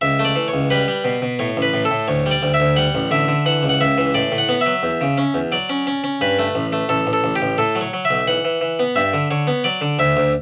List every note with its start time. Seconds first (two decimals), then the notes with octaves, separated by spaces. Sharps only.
0.01 C#2 E5
0.19 A3
0.25 D5
0.36 E3
0.48 C#5
0.53 C#2
0.70 G3 B4
0.88 G3
1.04 B2
1.22 B2
1.39 A2 C#5
1.57 A1 B4
1.74 A2
1.85 A4
1.91 A2
2.08 D2 C#5
2.26 G3
2.31 D5
2.42 D2
2.54 E5
2.60 D2
2.76 G3 F#5
2.95 A1
3.11 D3 E5
3.28 D3
3.46 E3 F#5
3.63 C#2
3.69 F#5
3.81 C#2 E5
3.98 E3
4.14 A2 D5
4.32 A2
4.38 F#5
4.49 B3
4.61 E5
4.66 F#3
4.83 E2
5.01 C#3
5.18 C#4
5.34 E2
5.52 F#3 D5
5.70 C#4
5.87 C#4
6.04 C#4
6.21 G2 B4
6.39 A3
6.55 A1
6.73 A3
6.89 A1 A4
7.07 A1
7.13 A4
7.24 A1
7.36 G4
7.42 A1
7.58 A2 A4
7.75 F#3
7.81 C#5
7.93 F#3
8.05 E5
8.11 B1
8.28 E3 F#5
8.45 E3
8.61 E3
8.79 B3
8.96 G2 E5
9.13 D3
9.31 D3 C#5
9.47 B3
9.64 F#3 D5
9.81 D3
9.99 D2 E5
10.17 D2